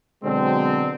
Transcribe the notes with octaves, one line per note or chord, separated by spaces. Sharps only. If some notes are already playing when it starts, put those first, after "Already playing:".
B2 D3 F#3 G#3 C4